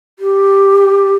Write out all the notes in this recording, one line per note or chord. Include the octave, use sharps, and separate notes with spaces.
G4